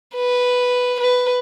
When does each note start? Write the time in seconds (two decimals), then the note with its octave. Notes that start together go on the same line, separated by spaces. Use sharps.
0.15 B4
1.00 B4